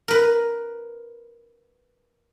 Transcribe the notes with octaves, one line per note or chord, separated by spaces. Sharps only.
A#4 B4